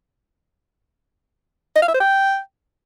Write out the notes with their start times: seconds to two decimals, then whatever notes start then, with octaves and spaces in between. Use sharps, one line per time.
1.76 D#5
1.82 F5
1.88 E5
1.94 C5
2.00 G5